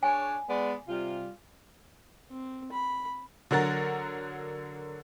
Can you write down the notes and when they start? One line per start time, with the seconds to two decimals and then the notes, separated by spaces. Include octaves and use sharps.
0.03 D4 G#4 C#5 G#5
0.49 G#3 B3 D5
0.87 C3 G3 F4
2.31 C4
2.72 B5
3.51 D3 F#3 A#4 F#5 A6